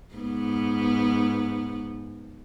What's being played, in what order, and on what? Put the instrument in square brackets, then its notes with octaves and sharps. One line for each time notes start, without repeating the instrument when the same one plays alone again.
[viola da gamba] G#2 B3